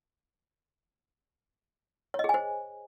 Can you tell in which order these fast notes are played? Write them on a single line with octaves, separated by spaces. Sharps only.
C#5 D#5 G#4 G#5 C5